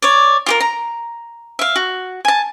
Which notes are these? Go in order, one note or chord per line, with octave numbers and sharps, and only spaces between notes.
C#5 D5
F4 G4 A#4
A#5
E5 F5
F#4
G#5 A5